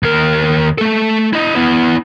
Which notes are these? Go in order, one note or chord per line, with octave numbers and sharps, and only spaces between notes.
D#2 A#4
A3 A4
E4 D#5
B3 E4